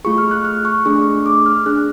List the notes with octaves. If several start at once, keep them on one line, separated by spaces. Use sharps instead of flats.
A3 F4 G#4 C#6
F6
F#6
F6
C#6
A3 D4 G#4 C#6
D6
F6
D4 G#4 F#6